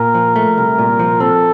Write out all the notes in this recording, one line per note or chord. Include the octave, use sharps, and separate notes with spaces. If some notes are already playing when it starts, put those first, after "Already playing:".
Already playing: A#2 A#4
F3
A3
C2
A#2
F3
C4 A4